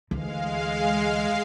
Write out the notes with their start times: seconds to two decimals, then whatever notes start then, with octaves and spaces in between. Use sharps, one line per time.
0.11 D2 E3 G#3 F5